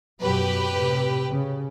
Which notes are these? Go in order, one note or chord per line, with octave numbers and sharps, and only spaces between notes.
F#2 B2 F#3 G4 B4
A2 C3
C#3